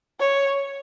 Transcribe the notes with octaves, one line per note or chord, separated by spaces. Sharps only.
C#5